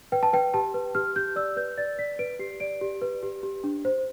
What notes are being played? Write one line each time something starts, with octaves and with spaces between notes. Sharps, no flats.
B4 G5
A5
B4 G5
G4 A5
B4
G4 F6
G4 G6
D5 E6
B4 G6
D5 A6
D5 B6
B4 D7
G4 C7
D5 D7
G4
B4
G4
G4
D4
C5